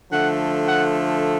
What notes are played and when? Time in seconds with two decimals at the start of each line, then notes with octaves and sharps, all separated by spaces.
0.10 D3 F3 A3 F#5
0.66 F#5